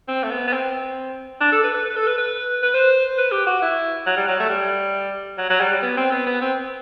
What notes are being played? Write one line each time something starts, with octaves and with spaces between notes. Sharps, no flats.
C4
A3
B3
B3
C4
D4
A4
B4
B4
B4
A4
B4
B4
B4
C5
B4
G4
F#4
E4
F#3
G3
F#3
A3
G3
F#3
F#3
G3
G3
B3
C4
B3
B3
C4